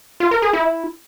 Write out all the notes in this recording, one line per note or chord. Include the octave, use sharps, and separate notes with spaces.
F4
A#4
G#4
E4